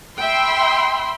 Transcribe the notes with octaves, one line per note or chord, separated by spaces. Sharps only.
E5 G5 B5 C6